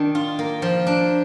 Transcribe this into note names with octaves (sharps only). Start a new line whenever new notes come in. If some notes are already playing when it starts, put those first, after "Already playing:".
Already playing: D#3 D4
F4
A#3
F3
D4